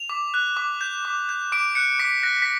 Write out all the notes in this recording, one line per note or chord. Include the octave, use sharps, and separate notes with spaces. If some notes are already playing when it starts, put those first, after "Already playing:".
Already playing: F7
D6
F#6
D6
G6
D6
G6
D6 D7
F#6 C#7
D6 B6
F#6 A#6
B6